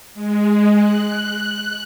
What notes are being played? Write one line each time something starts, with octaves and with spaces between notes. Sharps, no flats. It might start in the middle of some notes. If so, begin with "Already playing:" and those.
G#3
F#6